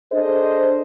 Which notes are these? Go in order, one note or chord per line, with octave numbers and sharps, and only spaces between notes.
D4 G#4 A4 C5 D#5